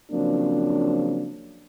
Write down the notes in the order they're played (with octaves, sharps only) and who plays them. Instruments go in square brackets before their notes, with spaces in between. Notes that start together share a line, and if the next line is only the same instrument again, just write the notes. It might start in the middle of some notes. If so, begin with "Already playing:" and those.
[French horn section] C#3 F3 F#3 A#3 C4 D4